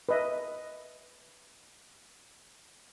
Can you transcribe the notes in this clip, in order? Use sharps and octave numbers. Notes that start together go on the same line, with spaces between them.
B4 D#5 E5